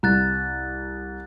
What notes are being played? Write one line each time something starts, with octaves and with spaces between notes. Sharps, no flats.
C2 A#5 F#6 A6